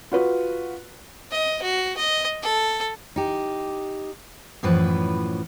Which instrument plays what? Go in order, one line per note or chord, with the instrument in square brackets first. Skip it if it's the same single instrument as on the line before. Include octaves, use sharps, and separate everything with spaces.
[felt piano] F4 F#4 B4
[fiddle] D#5
F#4
D#5
A4
[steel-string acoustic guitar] D#4 G4
F#2 A2 E3 F3 B4